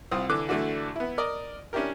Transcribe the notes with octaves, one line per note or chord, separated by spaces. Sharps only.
C2 C4 F4 D#6
D3 E3 D6 F#6
D3 E3 A3 D4 F#4
B3 E4
A#4 D5 D#5
C#4 D4 E4 G4 A#4